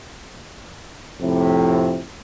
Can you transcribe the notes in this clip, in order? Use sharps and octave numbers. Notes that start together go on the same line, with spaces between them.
F2 A2 C3